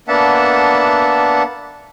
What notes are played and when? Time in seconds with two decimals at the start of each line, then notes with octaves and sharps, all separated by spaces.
0.08 A#3 B3 D4 E5 F#5 A5